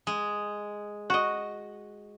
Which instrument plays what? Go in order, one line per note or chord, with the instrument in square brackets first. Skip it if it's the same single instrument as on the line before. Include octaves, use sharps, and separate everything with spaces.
[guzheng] G#3
[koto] F#4 D#5